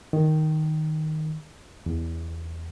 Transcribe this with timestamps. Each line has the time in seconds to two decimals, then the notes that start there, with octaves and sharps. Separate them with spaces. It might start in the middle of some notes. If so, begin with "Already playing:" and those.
0.13 D#3
1.86 E2